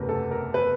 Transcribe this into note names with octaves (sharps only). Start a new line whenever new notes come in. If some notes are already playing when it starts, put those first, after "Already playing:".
Already playing: F#1 E2 C3 E3 A3 A#4 B4
A4
A#4
B4